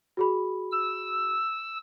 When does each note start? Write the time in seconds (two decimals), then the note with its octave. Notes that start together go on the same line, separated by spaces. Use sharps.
0.17 F#4 G#4 B5
0.72 E6